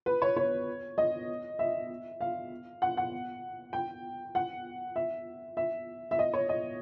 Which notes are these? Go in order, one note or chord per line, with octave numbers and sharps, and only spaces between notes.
B4
C#5
C#5
D#5
E5
F5
F#5
F#5
G5
F#5
E5
E5
E5
D#5
C#5
D#5